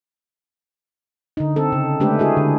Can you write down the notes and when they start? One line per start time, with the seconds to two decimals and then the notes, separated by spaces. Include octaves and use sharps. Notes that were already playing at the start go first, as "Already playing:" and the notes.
1.37 D3 D#4
1.56 C4 A4
1.72 C#3
2.00 G#3 A3 D4 G4 B4
2.19 E4 F#4 G#4
2.37 D3